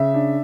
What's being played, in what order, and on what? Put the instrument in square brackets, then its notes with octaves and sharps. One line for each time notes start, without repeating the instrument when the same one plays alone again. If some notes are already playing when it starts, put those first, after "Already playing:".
Already playing: [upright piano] C#3 E5
D4